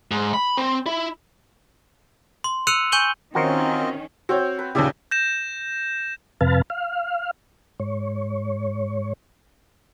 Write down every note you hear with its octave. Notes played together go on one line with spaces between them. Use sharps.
G#2
B5
C4
E4
C6
E6 F#6 C#7 D#7 F7 F#7
G#5 C#6 G6 D#7 F#7 G7
D#3 C4 C#4 F4 F#4 A#4 C5 D#5
C4 F#4 C#5 G5
B4
D#2 A#2 C#3 G4 D5 E5
G6 A#6 E7
F2 C3 B4 F5 A5
F5
G#2 C#5